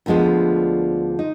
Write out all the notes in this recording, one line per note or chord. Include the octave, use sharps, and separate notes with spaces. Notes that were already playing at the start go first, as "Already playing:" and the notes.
D2 D3 F3 G#3 B3
D#4